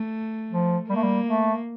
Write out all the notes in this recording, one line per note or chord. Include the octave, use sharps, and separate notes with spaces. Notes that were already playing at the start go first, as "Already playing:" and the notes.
Already playing: A3
F3
G3 A#3
A3
G3
A3